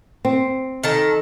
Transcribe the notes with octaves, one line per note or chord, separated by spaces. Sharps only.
C4
D#3 A4 A5